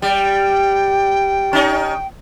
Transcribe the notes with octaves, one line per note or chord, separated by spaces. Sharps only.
G3 G5
C#4 D#4